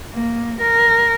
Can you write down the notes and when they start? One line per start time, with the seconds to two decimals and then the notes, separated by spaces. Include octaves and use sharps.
0.13 A#3
0.60 A#4